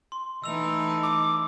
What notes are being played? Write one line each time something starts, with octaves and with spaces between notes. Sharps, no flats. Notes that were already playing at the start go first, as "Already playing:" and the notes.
C6
E3 A3 D#4 E6 F7
D6